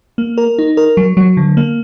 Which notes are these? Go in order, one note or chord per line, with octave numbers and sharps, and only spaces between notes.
A#3
A#4
D#4
A#4
F#3
F#3
D3
A#3